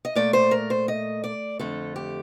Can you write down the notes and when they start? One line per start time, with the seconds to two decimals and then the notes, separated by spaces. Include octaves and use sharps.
0.05 D#5
0.15 A#2 A3 D5
0.33 C5
0.51 A#4
0.70 C5
0.88 D#5
1.24 D5
1.59 F2 D3 A3 A4
1.96 G4